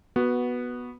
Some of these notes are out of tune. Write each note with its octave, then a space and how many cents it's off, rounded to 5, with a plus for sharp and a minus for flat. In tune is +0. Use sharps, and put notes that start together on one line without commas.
B3 -10 F#4 +0